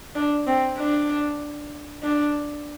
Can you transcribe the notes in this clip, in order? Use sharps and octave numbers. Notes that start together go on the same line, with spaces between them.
D4
C4
D4
D4